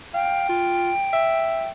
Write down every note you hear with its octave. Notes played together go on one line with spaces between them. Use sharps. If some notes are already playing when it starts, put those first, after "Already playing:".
F5 G5
F4
E5